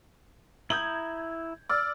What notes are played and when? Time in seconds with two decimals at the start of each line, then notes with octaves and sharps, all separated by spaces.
0.70 E4 A#5 D#6 G6 G#6 F#7
1.69 D5 E6 F6 A6